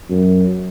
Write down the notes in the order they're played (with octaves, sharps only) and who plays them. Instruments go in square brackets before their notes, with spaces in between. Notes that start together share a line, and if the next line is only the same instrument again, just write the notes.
[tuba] F#2